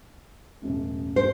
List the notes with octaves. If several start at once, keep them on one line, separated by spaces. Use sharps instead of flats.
E1 A1 F#2
C5